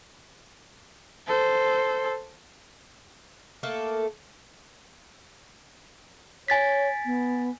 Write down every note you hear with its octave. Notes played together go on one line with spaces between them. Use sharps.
A4 C5
A3 A#3 A4
C#5 G#5 A6 B6
B3